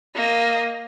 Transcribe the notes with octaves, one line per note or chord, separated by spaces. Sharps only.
A#3 D#5